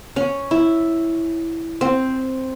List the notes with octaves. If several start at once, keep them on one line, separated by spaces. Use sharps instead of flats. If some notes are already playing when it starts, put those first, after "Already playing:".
C#4
E4
C4